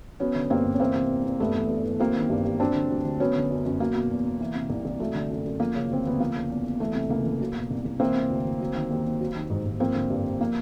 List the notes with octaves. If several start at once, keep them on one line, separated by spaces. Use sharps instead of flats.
F#3 B3 C#4
D3
G2 A#3 C4
G2
C#4
E3 A#3 C4
C3
E2
E2
G2 A3 B3
E3
G2
E3
F#3 A#3 C4
D#3
G2
G2
F#3 C4 D4
D3
D2
D2
F#3 B3 C#4
D3
F#2
F#2
F#3 A#3
B2
E2
E2
E3
C3
C2
C2
F#3 A3
D3
F#2
F#2
F3 A#3
C#3
D2 C4
D2 B3
F3 A#3
C#3
E2
E2
E3 A3
C3
C#2 A#3
C#2
F#3
B2
C2
C2
E3 A#3 C4
C3
D2
D2
F#3
D#3
D#2
D#2
F#3
D#3
G#2
G#2
F3 A#3 C4
D3
G2
G2
F3 A#3